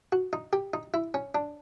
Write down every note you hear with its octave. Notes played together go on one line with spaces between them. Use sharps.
F#4
D#4
G4
D#4
E4
C#4
D4